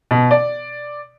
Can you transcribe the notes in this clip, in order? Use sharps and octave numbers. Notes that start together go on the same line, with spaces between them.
B2
D5